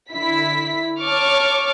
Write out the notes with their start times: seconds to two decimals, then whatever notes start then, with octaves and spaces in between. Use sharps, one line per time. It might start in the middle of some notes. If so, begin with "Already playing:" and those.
0.12 D3 E4 B6
1.00 C#5 A5 C#6 D6 F6